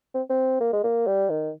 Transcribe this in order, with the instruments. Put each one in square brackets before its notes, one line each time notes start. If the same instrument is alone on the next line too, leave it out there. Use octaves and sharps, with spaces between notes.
[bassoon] C4
C4
A#3
G#3
A#3
G3
D#3